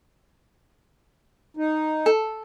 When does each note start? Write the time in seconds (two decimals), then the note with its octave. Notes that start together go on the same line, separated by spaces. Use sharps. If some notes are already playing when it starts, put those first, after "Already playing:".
1.57 D#4
2.06 A4